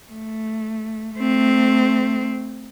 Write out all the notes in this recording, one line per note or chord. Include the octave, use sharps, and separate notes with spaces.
A3
A3 C4